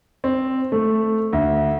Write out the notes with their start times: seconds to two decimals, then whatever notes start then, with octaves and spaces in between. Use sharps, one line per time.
0.24 C4
0.72 A3
1.33 D2